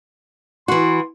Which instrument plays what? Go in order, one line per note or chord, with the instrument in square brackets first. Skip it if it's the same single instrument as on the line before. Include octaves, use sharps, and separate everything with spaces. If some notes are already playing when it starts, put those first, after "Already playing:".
[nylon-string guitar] E3 F#4 [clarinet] C6